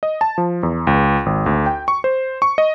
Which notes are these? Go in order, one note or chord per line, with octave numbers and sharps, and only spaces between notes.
D#5
A5
F3
E2
C#2
G#1
D2
G5
C#6
C5
C#6
D#5